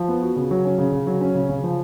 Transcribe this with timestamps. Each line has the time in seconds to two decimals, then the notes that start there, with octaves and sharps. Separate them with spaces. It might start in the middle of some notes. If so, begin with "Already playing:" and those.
Already playing: F3
0.08 B3
0.22 F#4
0.36 C#3
0.51 F#3
0.65 C#4
0.78 C#3
0.92 C#3
1.07 F#3
1.21 C#4
1.35 C#3
1.49 C#3
1.64 F3